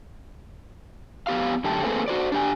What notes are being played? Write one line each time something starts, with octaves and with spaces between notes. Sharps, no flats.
F2 B3 G4 F5
F#2 D3 A3 G4 A5
A3 A#3 C4 G#4 A4 B4
F#4 C5 D5
D4 G4 G#5